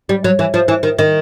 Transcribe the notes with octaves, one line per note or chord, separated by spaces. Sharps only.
G3
F#3
E3
F3
E3
D#3
D#3